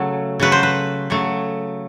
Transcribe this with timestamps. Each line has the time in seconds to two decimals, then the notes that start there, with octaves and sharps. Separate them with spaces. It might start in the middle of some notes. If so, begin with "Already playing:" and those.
Already playing: C#3 F#3 A3
0.40 C#3 F#3 A3 B4
0.52 C5
0.63 B4
1.10 C#3 F#3 A3